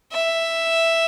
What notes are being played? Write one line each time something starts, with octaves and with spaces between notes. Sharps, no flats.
E5